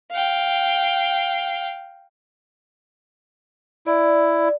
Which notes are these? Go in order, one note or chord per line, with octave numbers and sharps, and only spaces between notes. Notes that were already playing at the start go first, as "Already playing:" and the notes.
F5 G5
E4 D5